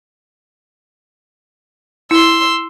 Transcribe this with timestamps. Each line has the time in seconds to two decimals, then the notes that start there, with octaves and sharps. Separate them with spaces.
2.11 E4 C6 E6